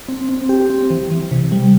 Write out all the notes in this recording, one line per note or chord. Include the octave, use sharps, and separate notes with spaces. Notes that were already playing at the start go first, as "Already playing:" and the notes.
C4
C4
G4
C4
E3
E3
C3
G3